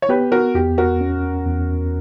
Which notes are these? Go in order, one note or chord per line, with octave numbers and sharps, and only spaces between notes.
C#5
B3 G4 B4
F#4 A#4
E2 G4
F#4 A#4
C#4
E2